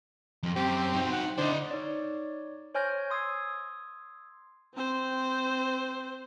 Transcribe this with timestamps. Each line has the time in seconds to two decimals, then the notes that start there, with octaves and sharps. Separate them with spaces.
0.43 F2
0.56 F#2 C4 G4
0.93 D#4 F#4
1.12 F#5
1.38 D3 E4 C5 D#5
1.71 D#4 C#5 D5
2.74 C5 C#5 G#5 F6 G6 A#6
3.10 C6 D#6 E6 G#6 C7
4.74 C4 C5